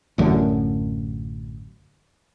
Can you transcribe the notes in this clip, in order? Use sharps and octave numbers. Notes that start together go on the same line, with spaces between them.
A1 F#2 D3